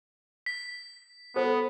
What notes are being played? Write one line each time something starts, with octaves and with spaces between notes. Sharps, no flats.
B6
B3 A4 C5